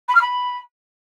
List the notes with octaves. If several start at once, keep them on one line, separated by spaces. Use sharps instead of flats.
B5
F6
B5